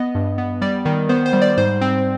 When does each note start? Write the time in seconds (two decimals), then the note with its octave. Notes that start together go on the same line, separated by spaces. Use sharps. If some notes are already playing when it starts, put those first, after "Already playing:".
Already playing: B3 D#5
0.15 G2
0.38 B3
0.62 G3 D5
0.85 D#3
1.09 B3 C5
1.26 C5
1.33 G3
1.42 D5
1.57 G#2 C5
1.81 C4